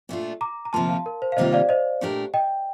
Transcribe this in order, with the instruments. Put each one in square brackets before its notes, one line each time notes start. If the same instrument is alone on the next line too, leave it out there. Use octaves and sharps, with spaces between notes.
[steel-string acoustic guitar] A#2 A3 D4 F4
[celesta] A#5 D6
A#5
[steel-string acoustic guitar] D2 C3 F3 A#3 F4 [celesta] A5 C6
[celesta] F5 A5
A#4
C5
F5
[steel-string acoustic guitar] C3 D#3 G3 A#3 F4 [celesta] C5 D#5
[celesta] D5 F5
C5 D#5
[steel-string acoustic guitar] A#2 A3 D4 G4 A#4
[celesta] D#5 G5